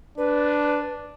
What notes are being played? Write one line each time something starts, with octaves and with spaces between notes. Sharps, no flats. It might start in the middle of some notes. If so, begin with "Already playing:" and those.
D4 B4